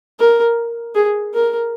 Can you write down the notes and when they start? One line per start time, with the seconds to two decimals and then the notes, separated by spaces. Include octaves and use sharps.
0.20 A#4
0.95 G#4
1.33 A#4